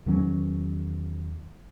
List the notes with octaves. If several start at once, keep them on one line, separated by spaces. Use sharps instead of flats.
E2 D#3 F#3 C#4